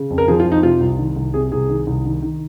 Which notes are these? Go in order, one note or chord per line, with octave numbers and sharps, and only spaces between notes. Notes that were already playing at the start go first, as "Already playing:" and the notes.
Already playing: C#3
F2
A#4
F3 G#4
F4
F2
D#4
C3 F4
C2
D#3
C2
C3 G#4
C2 G#4
D#3
C2
D#3
D#3